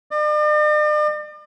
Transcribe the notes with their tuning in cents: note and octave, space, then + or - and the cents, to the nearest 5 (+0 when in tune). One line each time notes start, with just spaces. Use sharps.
D5 +45